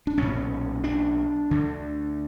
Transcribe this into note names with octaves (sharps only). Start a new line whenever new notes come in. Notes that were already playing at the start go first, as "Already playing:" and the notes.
D4
B1 A#2 C#4
D4
D2 D3